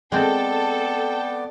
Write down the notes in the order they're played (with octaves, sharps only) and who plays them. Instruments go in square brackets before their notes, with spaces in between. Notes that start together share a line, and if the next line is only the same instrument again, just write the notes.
[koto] G#3 C4 [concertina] B3 D5 [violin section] A4 [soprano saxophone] G5